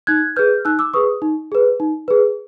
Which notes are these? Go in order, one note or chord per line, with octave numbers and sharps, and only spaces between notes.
D#4 F#6 G#6
G#4 B4 F6 G6
D#4 E6 F#6
D6 E6
G#4 B4 C#6 D#6
D#4
G#4 B4
D#4
G#4 B4